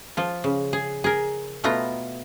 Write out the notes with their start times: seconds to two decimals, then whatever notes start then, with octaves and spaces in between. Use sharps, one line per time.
0.17 F3 F4
0.44 C#3
0.73 G#4
1.04 G#4 A#4
1.64 B2 A3 B3 F4 A#5